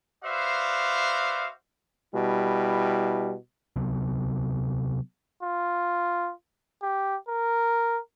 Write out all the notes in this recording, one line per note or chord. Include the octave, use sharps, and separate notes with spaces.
F#4 B4 C5 D5 E5 F5
B2 G3 E4
C3 F#3 B3
F4
G4
A#4